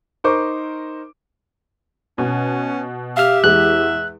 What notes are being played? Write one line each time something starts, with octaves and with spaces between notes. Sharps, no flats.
D#4 A#4 C5 C#6 D6
B2 C#4
G4 E5 F5 F6
E2 G#3 E4 F#6